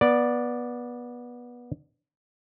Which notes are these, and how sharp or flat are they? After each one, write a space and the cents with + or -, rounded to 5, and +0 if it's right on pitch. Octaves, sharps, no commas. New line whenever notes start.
B3 -20 D5 +0